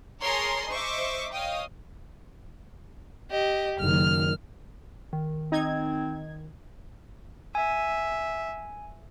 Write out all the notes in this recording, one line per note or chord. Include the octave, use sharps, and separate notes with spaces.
G#4 A#4 C#5 A5 A#5 C6
C5 D#5 E5 C#6 D6
C#5 D#5 F5 G5 D#6
G4 D#5
F#1 D#3 F6
D#3
C4 D#4 G#6
E5 G#5